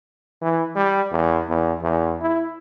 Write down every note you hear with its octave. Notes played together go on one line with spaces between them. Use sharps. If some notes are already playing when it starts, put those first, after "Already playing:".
E3
G3
E2
E2
E2
E4